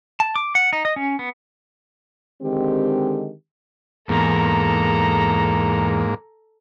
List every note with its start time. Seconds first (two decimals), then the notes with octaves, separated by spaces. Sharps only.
0.20 A5
0.36 D6
0.55 F#5
0.73 D#4
0.85 D#5
0.96 C#4
1.19 B3
2.42 D3 D#3 G#3 C4 G4
4.09 E2 G#2 A#3 A4 A#5